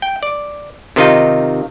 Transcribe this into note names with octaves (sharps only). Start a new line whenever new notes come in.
G5
D5
C3 D#3 D#4 F4 D#5